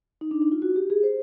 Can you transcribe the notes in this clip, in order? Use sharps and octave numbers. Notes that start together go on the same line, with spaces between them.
D#4
D4
D#4
F4
F#4
G4
G#4
C5